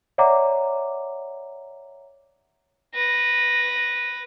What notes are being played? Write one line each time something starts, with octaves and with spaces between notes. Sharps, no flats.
C#5 D5 E5 F#5 A#5 D6
B4 A#6